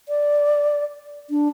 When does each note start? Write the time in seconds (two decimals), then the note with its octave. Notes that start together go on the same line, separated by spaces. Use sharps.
0.09 D5
1.30 D4